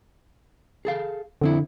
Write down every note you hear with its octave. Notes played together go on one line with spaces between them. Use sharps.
G#4 A4 F5
F2 D3 C4 E4